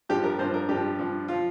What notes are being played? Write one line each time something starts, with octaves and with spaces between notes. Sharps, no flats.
G2 F3 G4
A#4
G2 F3 C5
A#4
G2 G4
F3
G2 F3
F3 F4